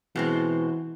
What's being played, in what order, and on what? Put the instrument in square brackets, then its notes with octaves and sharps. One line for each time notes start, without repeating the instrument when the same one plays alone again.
[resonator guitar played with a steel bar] B2 G#3 C4 [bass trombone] E3